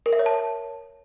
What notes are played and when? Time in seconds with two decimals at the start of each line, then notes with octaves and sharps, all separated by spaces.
0.06 A#4
0.13 E5
0.19 C#5
0.26 A5